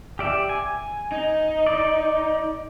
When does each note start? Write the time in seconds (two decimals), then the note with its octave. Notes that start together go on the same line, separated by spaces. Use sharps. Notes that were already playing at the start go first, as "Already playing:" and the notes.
0.19 G4 D5 E5
0.49 G#5
1.12 D#4
1.67 D5